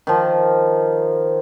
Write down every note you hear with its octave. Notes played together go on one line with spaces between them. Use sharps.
D#3 F3